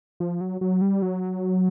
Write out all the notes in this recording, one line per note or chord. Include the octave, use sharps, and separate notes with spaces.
F3
F#3
F#3
G3
F#3